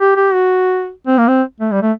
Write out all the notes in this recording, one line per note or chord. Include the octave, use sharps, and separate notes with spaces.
G4
G4
F#4
C4
A#3
C4
A3
G3
A3